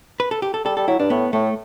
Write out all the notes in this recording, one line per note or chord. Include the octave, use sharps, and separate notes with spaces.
B4
A4
G4
A4
G3 A4
G3 A4
F#3 E4
G2 D4
A2 B3
A2 A3